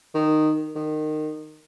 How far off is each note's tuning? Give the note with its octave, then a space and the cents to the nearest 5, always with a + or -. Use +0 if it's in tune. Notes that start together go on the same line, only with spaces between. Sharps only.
D#3 -10
D#3 -20